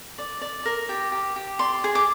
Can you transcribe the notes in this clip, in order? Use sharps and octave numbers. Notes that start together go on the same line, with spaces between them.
D5
D5
A#4
G4
G4
G4
D5 C6
G#4
D6